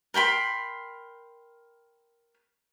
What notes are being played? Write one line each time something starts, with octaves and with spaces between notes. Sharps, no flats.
A#4 G5 B5 C6